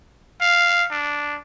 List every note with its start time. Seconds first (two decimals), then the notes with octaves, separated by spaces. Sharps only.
0.41 F5
0.90 D4